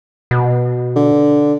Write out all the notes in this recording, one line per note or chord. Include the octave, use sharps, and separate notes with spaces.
B2
D3